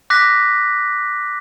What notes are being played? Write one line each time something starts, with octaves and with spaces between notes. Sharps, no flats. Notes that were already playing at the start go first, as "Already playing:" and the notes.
D6 F#6 A#6 B6